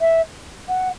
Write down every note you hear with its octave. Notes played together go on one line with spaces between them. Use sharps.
E5
F#5